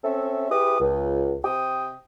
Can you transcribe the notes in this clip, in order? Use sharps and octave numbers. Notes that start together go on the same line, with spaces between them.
C4 C#4 A4 E5
E4 G4 G#4 B4 D6 D#6
C#2
C3 C5 G5 D#6